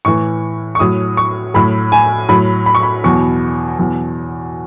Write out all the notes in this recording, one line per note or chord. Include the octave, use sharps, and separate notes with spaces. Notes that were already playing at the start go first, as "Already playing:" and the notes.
A2 E3 C#6
C#6
A2 F#3 D#6
C#6
A2 F#3 B5
G#5
A2 F#3 B5
B5
C#6
B5
E2 B2 F#3 C#6
E2 B2 F#3